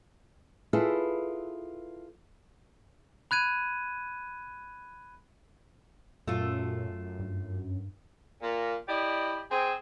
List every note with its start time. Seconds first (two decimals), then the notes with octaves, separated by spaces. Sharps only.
0.73 E4 F4 G#4 A4 B4
3.31 B5 F#6 G#6 D#7
6.27 F#2 A#2 A3 F4
7.19 G2
8.41 A#2 A#3
8.88 E4 G4 D5 D#5
9.51 C4 G#4